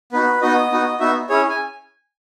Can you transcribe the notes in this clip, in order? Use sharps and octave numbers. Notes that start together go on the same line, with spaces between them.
B3 D#4 F#4 B4
B3 D#4 F#4 D#5
B3 D#4 F#4
B3 D#4 F#4 E5
C#4 E4 G#4 C#5
G#5